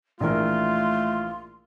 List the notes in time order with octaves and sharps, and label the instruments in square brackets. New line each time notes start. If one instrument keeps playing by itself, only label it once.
[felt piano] A#1 E3 A#4 [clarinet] A3 [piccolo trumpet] F4 [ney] C6